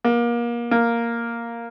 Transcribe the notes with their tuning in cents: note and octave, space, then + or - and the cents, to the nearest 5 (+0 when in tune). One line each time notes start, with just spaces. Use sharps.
A#3 +30
A#3 +0